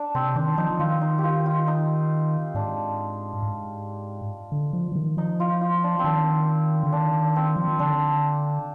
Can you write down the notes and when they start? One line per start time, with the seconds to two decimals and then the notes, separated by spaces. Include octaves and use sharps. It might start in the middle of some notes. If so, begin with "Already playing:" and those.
Already playing: D4
0.15 C3 C4
0.36 D#3 D4
0.58 F3 D#4
0.71 F3
0.79 D#3 F4
1.01 D#4
1.18 G4
1.23 F4
1.46 F4
1.67 D#4
2.54 G#2 D4
3.42 G#2
4.52 D3
4.73 F3
4.92 F3
4.96 D#3
5.17 F3 D#4
5.40 F4
5.61 F4
5.84 D4
5.99 C4
6.04 D#3 D4
6.83 D3
6.92 D#3 D4
7.36 C4
7.56 F3
7.68 D#3
7.79 D3 D4